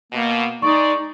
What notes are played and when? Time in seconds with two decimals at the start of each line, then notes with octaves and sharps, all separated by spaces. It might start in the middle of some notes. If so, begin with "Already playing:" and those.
0.12 B2 A#3
0.62 G#3 D#4 D5 C#6